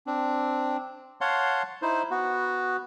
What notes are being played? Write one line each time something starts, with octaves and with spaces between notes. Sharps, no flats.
C4 D4
C#5 F5 F#5 A5 C6
D#4 E4 C5
B3 F#4